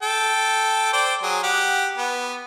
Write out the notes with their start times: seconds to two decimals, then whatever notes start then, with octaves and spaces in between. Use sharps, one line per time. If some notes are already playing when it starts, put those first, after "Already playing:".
0.03 A4 G5
0.93 C5 D5 G5
1.23 F#3 G#4
1.43 G4 F#5
1.98 B3